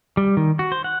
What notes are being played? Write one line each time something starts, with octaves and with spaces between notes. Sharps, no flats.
G3
D#3
F#4
C5
F#5